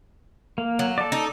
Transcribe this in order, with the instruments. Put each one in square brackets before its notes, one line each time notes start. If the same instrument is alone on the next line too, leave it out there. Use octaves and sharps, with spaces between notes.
[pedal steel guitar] A#3
[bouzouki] F#3
[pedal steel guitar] A4 D5
[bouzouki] D#4